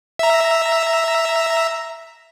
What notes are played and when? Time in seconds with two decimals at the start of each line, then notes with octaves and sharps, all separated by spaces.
0.19 E5 A#5